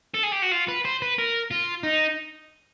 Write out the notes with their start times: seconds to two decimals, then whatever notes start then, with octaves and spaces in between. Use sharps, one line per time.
0.14 A4
0.24 G#4
0.33 G4
0.43 F#4
0.53 F4
0.69 B4
0.85 C5
1.02 B4
1.18 A#4
1.51 F4
1.83 D#4